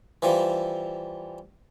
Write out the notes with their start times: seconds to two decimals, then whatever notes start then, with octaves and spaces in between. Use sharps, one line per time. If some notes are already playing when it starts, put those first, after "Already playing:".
0.22 E3 F3 G3